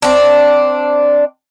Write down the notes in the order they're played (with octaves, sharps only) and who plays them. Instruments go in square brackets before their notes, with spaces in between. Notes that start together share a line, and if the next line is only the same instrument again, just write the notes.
[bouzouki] C4 D4